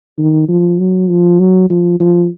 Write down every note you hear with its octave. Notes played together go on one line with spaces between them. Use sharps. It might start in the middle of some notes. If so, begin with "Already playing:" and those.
D#3
F3
F#3
F3
F#3
F3
F3